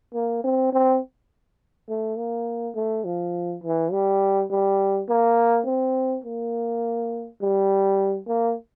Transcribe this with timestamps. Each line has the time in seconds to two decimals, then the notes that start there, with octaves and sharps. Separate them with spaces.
0.14 A#3
0.44 C4
0.73 C4
1.89 A3
2.18 A#3
2.75 A3
3.05 F3
3.64 E3
3.92 G3
4.50 G3
5.09 A#3
5.66 C4
6.24 A#3
7.41 G3
8.28 A#3